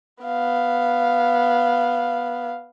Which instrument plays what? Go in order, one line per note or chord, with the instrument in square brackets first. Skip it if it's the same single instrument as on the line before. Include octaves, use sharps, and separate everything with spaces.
[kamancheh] B3 F5